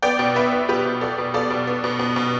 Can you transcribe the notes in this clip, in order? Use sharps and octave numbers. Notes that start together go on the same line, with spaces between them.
B3 D5 G5
B2
B3 B4 E5
B3
B2 G4 B4
B2
B3 A4 D5
B2
B3 A4 D5
B2
B3
B2
B2
B2